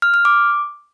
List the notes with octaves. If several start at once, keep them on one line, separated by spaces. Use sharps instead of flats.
F6
F6
D6